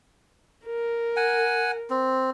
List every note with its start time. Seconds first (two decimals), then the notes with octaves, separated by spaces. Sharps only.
0.66 A#4
1.16 F#5 G#5
1.90 C4